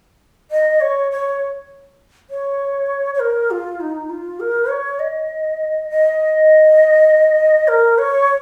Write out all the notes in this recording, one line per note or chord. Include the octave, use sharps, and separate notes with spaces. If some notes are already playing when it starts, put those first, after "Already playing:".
D#5
C#5
C#5
C#5
C#5
A#4
F4
D#4
F4
A#4
C#5
D#5
D#5
A#4
C#5